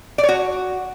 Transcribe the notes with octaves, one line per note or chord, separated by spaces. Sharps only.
D5
C#5
F#4